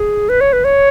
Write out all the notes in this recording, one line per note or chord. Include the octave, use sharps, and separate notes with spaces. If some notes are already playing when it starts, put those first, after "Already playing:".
Already playing: G#4
B4
C#5
B4
C#5